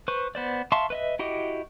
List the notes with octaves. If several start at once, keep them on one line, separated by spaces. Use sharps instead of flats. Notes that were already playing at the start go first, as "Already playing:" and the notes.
B4 C5 C#6
B3 C5 D5
E5 F5 A5 C6 C#6
B4 D#5 E5
E4 F#4 G4 D#5